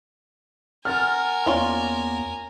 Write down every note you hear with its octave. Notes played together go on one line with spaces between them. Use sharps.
A#4 F#5 G#5 C6 F6 A6
E2 A#3 B3 C#4 F4 D5